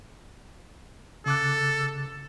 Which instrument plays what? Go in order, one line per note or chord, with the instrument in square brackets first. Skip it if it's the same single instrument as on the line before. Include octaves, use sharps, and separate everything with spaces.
[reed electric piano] C#3 D6 F#6 [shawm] A4